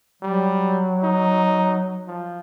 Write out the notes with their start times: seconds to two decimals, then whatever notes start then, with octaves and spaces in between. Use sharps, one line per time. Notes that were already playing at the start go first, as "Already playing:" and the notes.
0.22 F#3 G3
1.03 D#4
2.07 F3